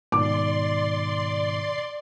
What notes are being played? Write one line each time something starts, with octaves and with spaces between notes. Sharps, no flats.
G#2 B2 D#3 D5 C6 D6